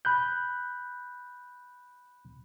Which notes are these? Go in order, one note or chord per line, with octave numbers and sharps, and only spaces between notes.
B5 F#6 G6